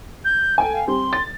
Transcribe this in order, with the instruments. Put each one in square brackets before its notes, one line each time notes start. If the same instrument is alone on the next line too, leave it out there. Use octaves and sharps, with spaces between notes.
[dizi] G6
[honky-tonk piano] A4 G5 G#5
[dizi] F5
[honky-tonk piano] G3 C4 [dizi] C6
[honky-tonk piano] A6